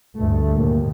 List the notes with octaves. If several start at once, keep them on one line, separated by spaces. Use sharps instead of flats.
D2 G2 A3
D#2 A#2